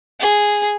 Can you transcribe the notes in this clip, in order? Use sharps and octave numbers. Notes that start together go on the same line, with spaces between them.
G#4